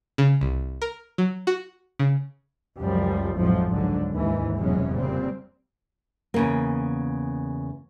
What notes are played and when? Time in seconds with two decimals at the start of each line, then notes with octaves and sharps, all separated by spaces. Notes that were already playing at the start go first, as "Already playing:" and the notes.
0.18 C#3
0.41 C2
0.82 A#4
1.18 F#3
1.47 F#4
1.99 C#3
2.81 C#2 F#2 F3 G3
3.37 A1 F2 G#2 F3 F#3
3.70 C#2 G#2 D3 F#3
4.13 D#2 G#2 E3
4.58 F1 E2 B2 F#3 G#3 C#4
4.93 A#2 C#3 G3 C4
6.34 E2 C#3 A#3